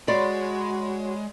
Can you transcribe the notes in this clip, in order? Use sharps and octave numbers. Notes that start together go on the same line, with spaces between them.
G#3 F#4 C#5 D5 B5 C6